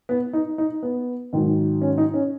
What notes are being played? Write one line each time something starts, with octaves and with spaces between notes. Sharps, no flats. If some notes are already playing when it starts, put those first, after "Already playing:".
B3
D#4
D#4
B3
G#2 D#3 F#3
C#4
D#4
C#4